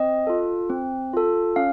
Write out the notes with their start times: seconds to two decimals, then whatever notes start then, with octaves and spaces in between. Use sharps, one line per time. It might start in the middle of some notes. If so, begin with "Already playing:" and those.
Already playing: C4 D#5
0.27 F4 A4
0.70 C4
1.13 F4 A4
1.56 C#4 F5